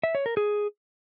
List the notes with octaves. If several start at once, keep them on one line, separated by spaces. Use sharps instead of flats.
E5
C#5
A#4
G#4